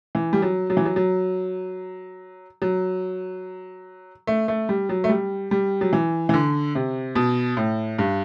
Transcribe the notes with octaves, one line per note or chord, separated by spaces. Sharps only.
E3
G3
F#3
F#3
E3
F#3
F#3
F#3
A3
A3
G3
F#3
A3
G3
G3
F#3
E3
E3
D3
C3
B2
A2
G2